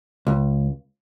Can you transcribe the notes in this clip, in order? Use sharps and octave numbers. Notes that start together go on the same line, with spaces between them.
C#2